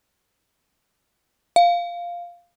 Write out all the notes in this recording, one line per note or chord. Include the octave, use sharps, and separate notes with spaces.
F5